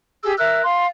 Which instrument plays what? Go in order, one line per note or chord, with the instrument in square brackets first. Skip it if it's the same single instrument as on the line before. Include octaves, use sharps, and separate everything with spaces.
[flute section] G4 G#4 E6
A#4 E5 E6 F#6
F5 C6